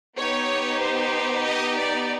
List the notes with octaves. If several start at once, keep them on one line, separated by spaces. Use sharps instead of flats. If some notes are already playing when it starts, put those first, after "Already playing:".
B3 D#4 G4 C#5
C5
D#5
D5